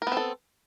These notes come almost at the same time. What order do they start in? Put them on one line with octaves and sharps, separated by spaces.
A#4 B3 C4 A4